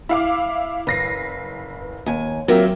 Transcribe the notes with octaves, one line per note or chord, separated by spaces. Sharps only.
E4 F5 D6
F#1 B4 A#6 C7
D#2 G#5
F#3 A#3 C4 F4 A#4 E5